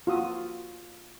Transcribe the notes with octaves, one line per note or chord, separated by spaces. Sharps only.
F4 F#4 D#6 E6